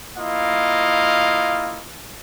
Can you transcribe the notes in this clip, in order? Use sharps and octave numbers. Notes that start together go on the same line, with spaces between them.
A#3 E4 F4 D#5 F5